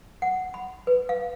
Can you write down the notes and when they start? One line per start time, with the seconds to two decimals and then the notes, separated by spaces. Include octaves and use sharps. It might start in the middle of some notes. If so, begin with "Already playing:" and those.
0.22 F#5
0.54 B5
0.87 B4
1.09 F5